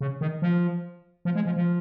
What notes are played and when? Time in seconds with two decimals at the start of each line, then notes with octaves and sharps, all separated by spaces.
0.01 C#3
0.21 D#3
0.42 F3
1.25 F3
1.35 G#3
1.46 F3
1.56 F3